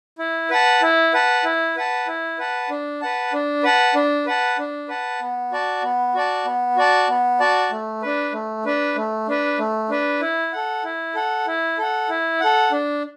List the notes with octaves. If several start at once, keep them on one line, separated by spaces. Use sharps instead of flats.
E4
B4 F#5 A5
E4
B4 F#5 A5
E4
B4 F#5 A5
E4
B4 F#5 A5
D4
B4 F#5 A5
D4
B4 F#5 A5
D4
B4 F#5 A5
D4
B4 F#5 A5
B3
F#4 D5 A5
B3
F#4 D5 A5
B3
F#4 D5 A5
B3
F#4 D5 A5
A3
D4 B4
A3
D4 B4
A3
D4 B4
A3
D4 B4
E4
A4 F#5
E4
A4 F#5
E4
A4 F#5
E4
A4 F#5
D4